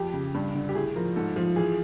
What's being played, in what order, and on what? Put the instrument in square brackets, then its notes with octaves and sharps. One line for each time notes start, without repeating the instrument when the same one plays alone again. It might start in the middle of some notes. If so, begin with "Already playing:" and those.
Already playing: [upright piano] F2 G4
C#3
G2
D3
G4
A2 G#4
F3 A#4
G#2 A4
F3
E3 G#4